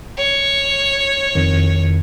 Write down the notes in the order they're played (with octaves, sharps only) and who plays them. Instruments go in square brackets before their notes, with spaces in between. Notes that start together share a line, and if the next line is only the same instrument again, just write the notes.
[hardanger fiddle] C#5
[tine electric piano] F2 D#3